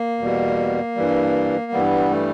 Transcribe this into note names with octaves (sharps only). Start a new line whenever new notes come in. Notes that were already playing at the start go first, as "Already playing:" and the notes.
Already playing: A#3
E2 B2 G3
G2 E3 G3
G2 E3 G3 B3
A3